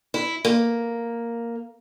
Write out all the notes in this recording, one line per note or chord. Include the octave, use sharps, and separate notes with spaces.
E4
A#3